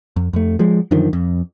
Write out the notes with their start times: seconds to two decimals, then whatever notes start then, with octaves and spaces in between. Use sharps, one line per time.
0.16 F2
0.33 F2 A3
0.59 F3 G#3
0.91 F#2 D3 D#3 F3
1.13 F2